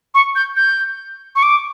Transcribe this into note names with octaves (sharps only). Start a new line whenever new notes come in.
C#6
G6
G6
C#6
D6